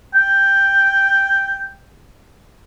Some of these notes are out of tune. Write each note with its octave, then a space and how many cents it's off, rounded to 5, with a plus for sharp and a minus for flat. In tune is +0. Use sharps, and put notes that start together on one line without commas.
G5 +5